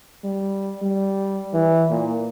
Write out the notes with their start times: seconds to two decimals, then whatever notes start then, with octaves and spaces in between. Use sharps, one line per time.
0.24 G3
0.83 G3
1.53 E3
1.90 A#2